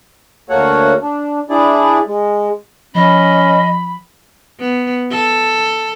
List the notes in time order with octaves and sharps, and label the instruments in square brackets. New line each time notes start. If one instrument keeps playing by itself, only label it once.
[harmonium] D2 A#3 F#4 A4 C#5 F#5
D4
D4 E4 G#4 D5
G#3
[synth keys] F3 [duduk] C#4 [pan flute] D#5 [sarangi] B5
[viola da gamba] B3
A4